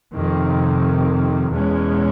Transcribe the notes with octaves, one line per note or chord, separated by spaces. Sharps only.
F2 C3 D#3
E2 B2 G#3 C#4